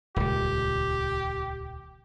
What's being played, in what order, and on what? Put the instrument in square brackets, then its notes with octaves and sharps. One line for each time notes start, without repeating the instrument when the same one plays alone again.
[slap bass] D#1 C#2 [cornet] G4